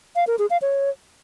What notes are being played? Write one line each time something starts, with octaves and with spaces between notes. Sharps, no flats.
F5
A#4
G#4
F5
C#5